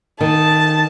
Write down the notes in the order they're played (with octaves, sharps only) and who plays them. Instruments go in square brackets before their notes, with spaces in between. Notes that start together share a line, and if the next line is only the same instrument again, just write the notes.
[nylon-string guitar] D#3 [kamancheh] A5